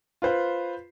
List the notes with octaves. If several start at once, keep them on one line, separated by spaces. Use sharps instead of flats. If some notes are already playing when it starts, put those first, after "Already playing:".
F4 B4 C5